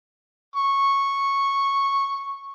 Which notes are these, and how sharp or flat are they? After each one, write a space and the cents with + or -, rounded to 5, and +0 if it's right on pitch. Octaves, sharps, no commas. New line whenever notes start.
C#6 -5